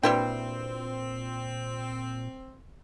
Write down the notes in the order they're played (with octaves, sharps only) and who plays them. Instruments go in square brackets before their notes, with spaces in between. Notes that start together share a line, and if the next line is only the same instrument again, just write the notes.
[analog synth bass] A#2 [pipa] G3 E4 G5 [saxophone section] C4 [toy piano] D4 F#4 B4